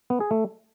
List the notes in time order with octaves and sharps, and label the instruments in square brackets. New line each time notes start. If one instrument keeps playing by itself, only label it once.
[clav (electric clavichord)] B3
G#4
A3